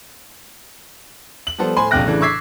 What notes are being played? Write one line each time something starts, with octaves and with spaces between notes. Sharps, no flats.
F#7
F3 G3 B3 A4 C5
A2 C5 G#5 B5 C6
A#1 F2 C3 G5 F#6 A#6
A2 C#3 E3 D4
C#6 D6 E6 G#6 B6 C7